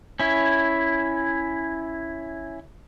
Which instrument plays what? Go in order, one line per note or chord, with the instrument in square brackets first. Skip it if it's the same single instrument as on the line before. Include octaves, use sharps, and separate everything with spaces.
[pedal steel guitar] C#4 E4